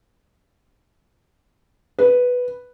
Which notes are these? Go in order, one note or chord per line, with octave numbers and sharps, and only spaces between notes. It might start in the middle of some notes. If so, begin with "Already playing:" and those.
B4